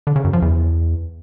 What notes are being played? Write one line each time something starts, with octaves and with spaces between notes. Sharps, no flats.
D3
C#3
F#2
F3
E2